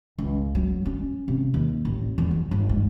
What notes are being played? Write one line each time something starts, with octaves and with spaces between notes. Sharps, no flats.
C#2
F#3
C#4
C3
D#2
A1
E2
F#3
G1
G#2